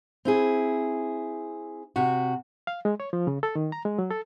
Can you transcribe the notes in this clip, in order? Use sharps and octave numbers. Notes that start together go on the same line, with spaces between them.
C4 E4 G#4
C3 F#4
F5
G#3
C#5
F3
C#3
A4
D#3
A#5
G#3
F#3
A4